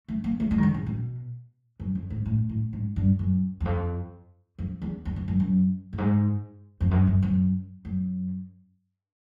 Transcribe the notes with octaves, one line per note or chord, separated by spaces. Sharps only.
A3
A#3
A3
G#3
D#3
D3
C#3
B2
F#2
F2
G#2
A2
A2
G#2
G2
F#2
E2
F2
F2
E2
E2
F2
F#2
F#2
G2
G#2
F2
F#2
F#2
F#2
F#2